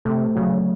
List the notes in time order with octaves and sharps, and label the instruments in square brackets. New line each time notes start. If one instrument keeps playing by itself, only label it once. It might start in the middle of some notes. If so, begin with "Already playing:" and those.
[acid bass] C3 [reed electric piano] A3
[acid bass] C#3 [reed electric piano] F#3